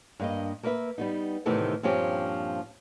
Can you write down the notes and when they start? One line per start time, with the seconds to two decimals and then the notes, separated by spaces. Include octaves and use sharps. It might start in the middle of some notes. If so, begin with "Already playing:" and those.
0.20 G2 A#3 D#5
0.63 A#3 A#4 B4 D5 E5
0.98 G3 B3 D#4
1.45 A2 C3 D#3 E3 A3 B3
1.83 G2 A#2 F3 C4 C#4 G4